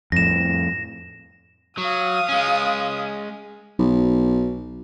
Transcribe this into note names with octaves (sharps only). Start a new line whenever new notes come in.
F2 A2 A#6 E7
F#3 F5 D#6
G#3 C#4
B1